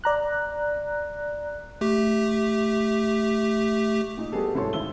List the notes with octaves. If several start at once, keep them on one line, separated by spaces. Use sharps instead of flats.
D5 A#5 F#6
A3 G4
A#2 D#4
G3 B3 F#4 G#4 A4
C2 G#2 A4 C#5 C6
G#1 E4 E6 G7